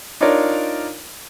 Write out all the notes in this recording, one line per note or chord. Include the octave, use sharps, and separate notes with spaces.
D4 D#4 F4 A#4 C#5 D5